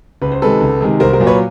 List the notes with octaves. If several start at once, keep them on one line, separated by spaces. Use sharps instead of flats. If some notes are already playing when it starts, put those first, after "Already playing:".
C#2 B4
C5
C3 D#3 G#3 A4 B4
C#2
C3 D#3 G#3
C2 A#4 C5
A#4 C5
A#2 F#3
B4 C#5